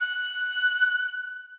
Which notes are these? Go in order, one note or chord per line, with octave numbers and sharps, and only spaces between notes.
F#6